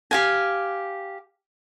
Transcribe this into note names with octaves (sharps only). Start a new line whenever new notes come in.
G4 F5 G#5